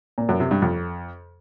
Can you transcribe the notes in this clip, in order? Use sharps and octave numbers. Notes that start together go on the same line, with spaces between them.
A#2
F#2
C3
G2
F2